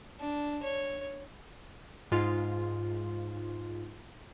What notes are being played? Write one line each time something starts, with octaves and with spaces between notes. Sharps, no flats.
D4
C#5
G#2 F4